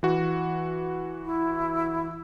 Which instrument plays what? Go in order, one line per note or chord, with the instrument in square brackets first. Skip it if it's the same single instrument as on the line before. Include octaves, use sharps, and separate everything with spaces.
[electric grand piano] E3 F#4
[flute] E4